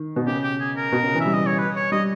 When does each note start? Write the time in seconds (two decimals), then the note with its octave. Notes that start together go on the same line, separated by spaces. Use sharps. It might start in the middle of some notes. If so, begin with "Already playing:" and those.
Already playing: D#3
0.16 B2
0.26 C#3 G4
0.43 G4
0.60 G#4
0.76 A#4
0.92 B2
1.03 C#3
1.15 E3
1.20 E5
1.26 G3
1.34 D#5
1.46 C#5
1.58 B4
1.76 C#5
1.92 G3 D#5